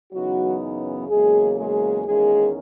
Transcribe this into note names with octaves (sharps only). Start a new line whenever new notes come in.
F#2 C#3 E3 F#3 B3 D#4 F#4
E2 C#3 F#3 G#3 A#3 G#4
G#3 G#4
E2 D#3 G#3 A#3 C#4 G#4